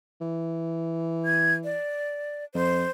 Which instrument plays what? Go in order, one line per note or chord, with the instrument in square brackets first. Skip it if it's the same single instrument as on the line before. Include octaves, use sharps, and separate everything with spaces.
[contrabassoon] E3
[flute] G#6
D5
[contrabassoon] F2 [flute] C5